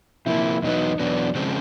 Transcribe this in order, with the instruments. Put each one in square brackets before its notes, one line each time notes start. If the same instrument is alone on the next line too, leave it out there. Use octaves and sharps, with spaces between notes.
[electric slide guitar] C3 F3 A#3 [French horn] E4
[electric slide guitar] E2 B2 F#3 B3 [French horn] D#4
[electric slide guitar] E2 B2 F#3 B3 [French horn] D4
[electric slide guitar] C#3 F3 G#3 C4